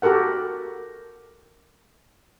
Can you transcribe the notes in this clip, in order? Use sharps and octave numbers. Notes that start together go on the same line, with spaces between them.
F#4 G4 A4 A#4 F#5